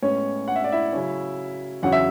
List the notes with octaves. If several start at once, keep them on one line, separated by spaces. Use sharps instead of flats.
A2 G#3 B3 C#4 C#5
F#5
E5
D5
E4 E5
C#3 F#3 C#4
E2 C#3 F#3 C#4 F#5
E5